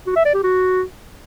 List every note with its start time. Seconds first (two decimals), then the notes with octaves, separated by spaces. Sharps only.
0.07 F#4
0.16 E5
0.25 D5
0.34 G4
0.43 F#4